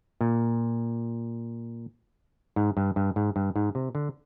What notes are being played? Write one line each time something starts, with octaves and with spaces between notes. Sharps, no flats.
A#2
G#2
G2
G2
G#2
G2
G#2
C3
D3